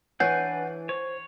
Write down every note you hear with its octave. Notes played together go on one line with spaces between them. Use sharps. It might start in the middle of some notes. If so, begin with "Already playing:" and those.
E3 D4 B4 C#5 F#5 G#5 G6 C7
C5 C#5